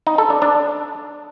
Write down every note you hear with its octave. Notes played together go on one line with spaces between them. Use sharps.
D#4
A4
D4
D4